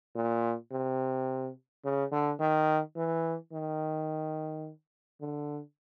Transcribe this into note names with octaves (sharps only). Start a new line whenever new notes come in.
A#2
C3
C#3
D3
D#3
E3
D#3
D3